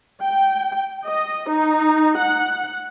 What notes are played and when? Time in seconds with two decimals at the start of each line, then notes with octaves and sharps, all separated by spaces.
0.21 G5
1.06 D#5
1.49 D#4
2.17 F#5